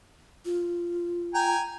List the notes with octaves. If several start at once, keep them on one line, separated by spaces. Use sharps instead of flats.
F4
G5 G#5 A#5